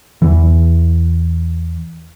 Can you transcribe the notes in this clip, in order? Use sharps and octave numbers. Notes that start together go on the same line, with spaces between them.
E2 E3